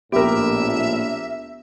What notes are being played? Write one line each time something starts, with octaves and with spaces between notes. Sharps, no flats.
A#1 A2 B3 G4 A#4 E5